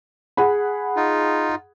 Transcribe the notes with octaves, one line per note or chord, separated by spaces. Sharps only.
G#4 F#5 B5
D#4 F4